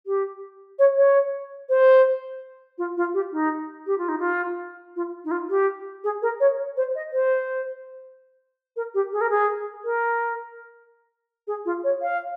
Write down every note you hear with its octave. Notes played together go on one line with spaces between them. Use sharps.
G4
C#5
C#5
C5
F4
F4
G4
D#4
G4
F4
D#4
F4
F4
D#4
F4
G4
G#4
A#4
C#5
C5
D#5
C5
A#4
G4
G#4
A#4
G#4
A#4
G#4
F4
C#5
F5